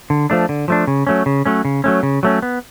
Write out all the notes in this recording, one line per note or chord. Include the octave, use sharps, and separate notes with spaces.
D3
F3 A3 D4
D3
F3 A3 D4
C#3
F#3 A3 C#4
C#3
F#3 A3 C#4
C#3
F#3 A3 C#4
C#3
F#3 A3 C#4
B3